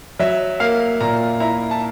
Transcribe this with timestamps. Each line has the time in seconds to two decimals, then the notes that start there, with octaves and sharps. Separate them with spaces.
0.19 F#3 E5
0.60 A#3 F5
1.01 A#2 A#5
1.40 E4 A#5
1.71 A5